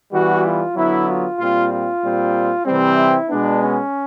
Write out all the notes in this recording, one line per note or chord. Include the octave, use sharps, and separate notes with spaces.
E3 G3 B3 F#4
F4
D3 F#3 B3 E4
F4
A#2 G3 C4 F4
F4
A#2 G3 C4
C3 E3 G3 C4
E4
B2 G#3 B3 D4
C#4